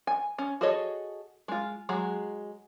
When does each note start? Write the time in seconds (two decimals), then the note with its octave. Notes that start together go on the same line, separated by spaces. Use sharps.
0.07 G#5
0.38 C#4
0.61 F#4 G#4 A4 C#5 D#5
1.48 G#3 F4
1.89 F#3 G#3 G#4